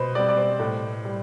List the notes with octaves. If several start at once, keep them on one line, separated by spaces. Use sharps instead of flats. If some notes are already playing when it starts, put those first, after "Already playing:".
Already playing: B2 B4 C5
G3 C4 D5
D5
C5
A2
G3